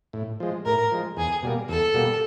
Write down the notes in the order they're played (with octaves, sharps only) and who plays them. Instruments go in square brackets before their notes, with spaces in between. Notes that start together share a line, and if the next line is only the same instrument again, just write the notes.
[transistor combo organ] A2
F3 G#3
[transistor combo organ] A2 [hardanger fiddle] A#4
[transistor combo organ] F3 G#3
[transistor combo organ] E2 [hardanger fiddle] G#4
[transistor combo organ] B2 G3 A#3
[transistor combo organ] E2 [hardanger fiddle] A4
[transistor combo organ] B2 G3 A#3